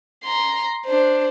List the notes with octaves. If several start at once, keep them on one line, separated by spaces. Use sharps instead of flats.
A#5 C6
D4 C5